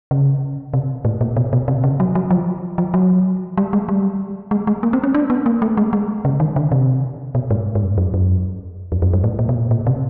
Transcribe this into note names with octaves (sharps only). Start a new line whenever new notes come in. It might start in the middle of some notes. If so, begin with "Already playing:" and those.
C#3
C3
A2
A#2
B2
B2
C3
C#3
F#3
F#3
F3
F3
F#3
G3
G#3
G3
G#3
G#3
A#3
C4
C#4
D4
B3
A#3
A3
G#3
G#3
C#3
D#3
D3
C3
B2
G#2
G#2
G2
F#2
F#2
F2
F#2
G2
A2
A#2
B2
A#2
A#2
C3